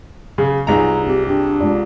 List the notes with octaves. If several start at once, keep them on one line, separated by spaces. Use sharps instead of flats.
C#3 F#3
C2 D#4 F4 G#4 B4 A#5
C4 G4
D4 G4
G#3 F4 D5